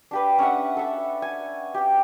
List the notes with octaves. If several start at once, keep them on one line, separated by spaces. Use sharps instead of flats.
D4 G4 B4
C#4 D4 E5 F#5
A4 E5 A5
G#5
G4 G5